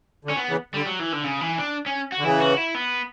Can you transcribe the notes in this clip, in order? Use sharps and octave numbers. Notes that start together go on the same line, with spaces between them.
D3
C#4
B3
C#3 E3
D3 G3
F#3
E3
D3
C#3
E3
D4
C#4
F#4
D3
C#3 E3 E4
F#4
E4
B3